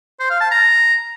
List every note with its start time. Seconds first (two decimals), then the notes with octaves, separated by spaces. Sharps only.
0.20 C5
0.30 F5
0.41 A5
0.51 A#5